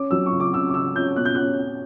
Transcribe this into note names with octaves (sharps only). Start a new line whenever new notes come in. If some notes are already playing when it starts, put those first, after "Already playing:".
Already playing: C#4 D6
F#3 E6
C#6
C#3
D6
C#3 E6
D6
C#3 E6
C#4 G6
B2 F#6
G6
C#4 F#6
C#4